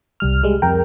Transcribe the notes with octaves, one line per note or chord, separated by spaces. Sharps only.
C2 G3 F6
G3 G#3
F2 A#4 G5